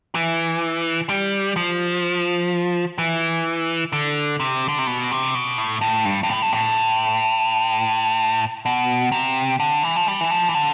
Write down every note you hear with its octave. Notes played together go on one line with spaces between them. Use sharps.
E3
G3
F3
E3
D3
C3
D3
C3
B2
C3
B2
A2
A2
G2
G2
A2
G2
A2
B2
C3
D3
E3
F3
G3
E3
F3
E3
D3